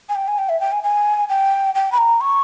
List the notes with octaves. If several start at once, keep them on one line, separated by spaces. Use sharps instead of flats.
G#5
G5
G#5
G5
E5
G5
G#5
G#5
G5
G5
B5
A#5
C#6